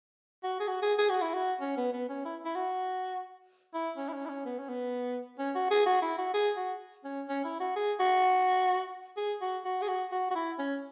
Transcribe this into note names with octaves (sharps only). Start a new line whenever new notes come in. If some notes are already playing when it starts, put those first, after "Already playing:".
F#4
G#4
F#4
G#4
G#4
F#4
E4
F#4
C#4
B3
B3
C#4
E4
E4
F#4
E4
C#4
E4
C#4
E4
C#4
B3
C#4
B3
C#4
F#4
G#4
F#4
E4
F#4
G#4
F#4
C#4
C#4
E4
F#4
G#4
F#4
G#4
F#4
F#4
G#4
F#4
F#4
F#4
E4
C#4